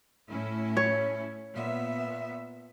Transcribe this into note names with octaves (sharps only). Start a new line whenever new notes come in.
A2 C#4 E4
C#5
A#2 B3 E5